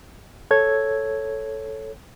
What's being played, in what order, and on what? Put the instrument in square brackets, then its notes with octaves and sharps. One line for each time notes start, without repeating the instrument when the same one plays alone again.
[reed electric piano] A4 C#5 G#6